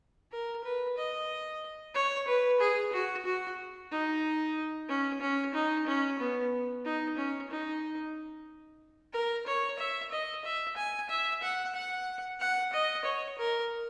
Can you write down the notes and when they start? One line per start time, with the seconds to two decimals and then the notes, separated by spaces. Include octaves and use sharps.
0.32 A#4
0.64 B4
0.97 D#5
1.94 C#5
2.28 B4
2.60 G#4
2.93 F#4
3.25 F#4
3.91 D#4
4.89 C#4
5.21 C#4
5.54 D#4
5.87 C#4
6.19 B3
6.85 D#4
7.17 C#4
7.50 D#4
9.13 A#4
9.46 C#5
9.79 E5
10.11 D#5
10.44 E5
10.77 G#5
11.09 E5
11.42 F#5
11.74 F#5
12.40 F#5
12.73 D#5
13.05 C#5
13.38 A#4